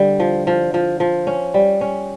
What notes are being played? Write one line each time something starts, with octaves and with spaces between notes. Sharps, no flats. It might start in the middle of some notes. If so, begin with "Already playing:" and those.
Already playing: D3 G3
F3
F3
F3
F3
C#4
G3
C#4